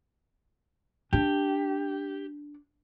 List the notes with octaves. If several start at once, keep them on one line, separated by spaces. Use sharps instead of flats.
D4 G4